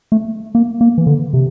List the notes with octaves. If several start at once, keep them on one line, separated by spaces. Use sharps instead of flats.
A3
A#3
A#3
E3
D3
C3